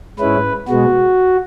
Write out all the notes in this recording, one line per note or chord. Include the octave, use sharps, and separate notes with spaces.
G#2 G#3 C#4 E4 B4
B2 G#3 B3 F#4